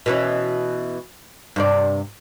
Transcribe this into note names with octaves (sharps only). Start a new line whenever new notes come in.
B2 E3 C#4
G2 C3 D5